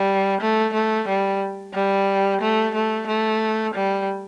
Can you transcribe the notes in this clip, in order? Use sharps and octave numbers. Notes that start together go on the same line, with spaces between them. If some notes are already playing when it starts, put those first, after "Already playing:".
Already playing: G3
A3
A3
G3
G3
A3
A3
A3
G3